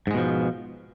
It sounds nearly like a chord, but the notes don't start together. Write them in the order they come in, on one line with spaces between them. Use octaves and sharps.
G#2 G#3 B2 F3